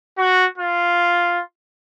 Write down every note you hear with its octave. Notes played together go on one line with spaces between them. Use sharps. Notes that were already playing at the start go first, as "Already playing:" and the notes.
F#4
F4